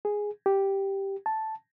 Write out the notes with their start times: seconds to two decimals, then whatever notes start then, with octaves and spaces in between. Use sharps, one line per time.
0.05 G#4
0.46 G4
1.26 A5